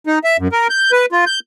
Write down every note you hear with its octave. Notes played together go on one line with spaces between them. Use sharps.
D#4
E5
F#2
A#4
G6
B4
F4
G6